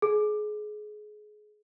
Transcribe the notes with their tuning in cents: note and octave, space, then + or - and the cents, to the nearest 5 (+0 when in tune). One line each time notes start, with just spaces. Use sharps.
G#4 +25